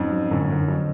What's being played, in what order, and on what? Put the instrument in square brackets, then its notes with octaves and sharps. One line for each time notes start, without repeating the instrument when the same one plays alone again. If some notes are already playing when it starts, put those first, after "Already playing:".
Already playing: [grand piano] F2 G#2 [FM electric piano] F#3 C#4
[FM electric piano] F#3
[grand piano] F#2 A2 [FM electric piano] D3
[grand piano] F#2 [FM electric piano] D3
[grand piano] F2 [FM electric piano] F#3